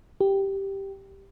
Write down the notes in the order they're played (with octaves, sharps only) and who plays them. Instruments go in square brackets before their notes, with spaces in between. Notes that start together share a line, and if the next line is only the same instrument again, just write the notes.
[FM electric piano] G4